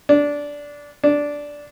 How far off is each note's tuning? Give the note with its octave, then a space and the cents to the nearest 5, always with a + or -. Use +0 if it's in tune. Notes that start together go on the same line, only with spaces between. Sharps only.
D4 -15
D4 -10